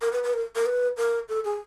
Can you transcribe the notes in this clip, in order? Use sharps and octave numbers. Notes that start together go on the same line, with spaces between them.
A#4
B4
B4
A#4
A#4
B4
A#4
A4
G#4